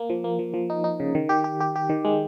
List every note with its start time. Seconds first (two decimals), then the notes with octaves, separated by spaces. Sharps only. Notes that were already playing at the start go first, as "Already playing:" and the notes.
Already playing: A#3
0.10 F3
0.24 A#3
0.39 F3
0.54 F3
0.70 D#4
0.84 D#4
1.00 C#3
1.15 D#3
1.29 G4
1.44 G4
1.60 G4
1.76 G4
1.89 D#3
2.05 G#3